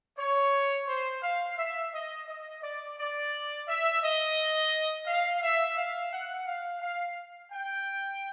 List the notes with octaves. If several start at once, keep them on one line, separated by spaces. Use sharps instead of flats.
C#5
C5
F5
E5
D#5
D#5
D5
D5
E5
D#5
F5
E5
F5
F#5
F5
F5
G5